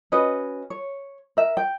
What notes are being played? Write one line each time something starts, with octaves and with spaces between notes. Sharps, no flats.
C#4 F#4 B4 D#5
C#5
A#4 E5
G5